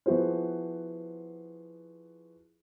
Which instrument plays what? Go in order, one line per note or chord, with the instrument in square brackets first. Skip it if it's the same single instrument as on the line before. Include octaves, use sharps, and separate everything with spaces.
[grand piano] F3 B3 E4 F#4 G#4 C5